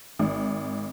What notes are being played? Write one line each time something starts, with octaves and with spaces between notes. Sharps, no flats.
G#1